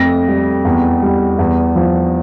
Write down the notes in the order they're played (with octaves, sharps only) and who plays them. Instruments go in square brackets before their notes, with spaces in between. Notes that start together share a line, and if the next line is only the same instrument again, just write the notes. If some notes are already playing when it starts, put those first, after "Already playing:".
Already playing: [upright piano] F2 A3 A#6
G3
E2
G3
E2
F3